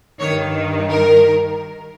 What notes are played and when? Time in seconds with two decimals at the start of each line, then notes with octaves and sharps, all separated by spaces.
0.20 G2 D#3 C#5
0.90 A#4